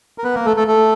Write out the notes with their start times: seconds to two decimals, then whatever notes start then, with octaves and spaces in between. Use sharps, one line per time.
0.18 A#4
0.24 B3 B4
0.35 A#3 A#4
0.45 A3 A4
0.57 A3 A4
0.68 A3 A4